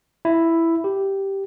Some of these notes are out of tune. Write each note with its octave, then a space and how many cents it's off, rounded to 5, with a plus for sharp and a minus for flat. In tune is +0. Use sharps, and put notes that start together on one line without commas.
E4 +5
G4 -5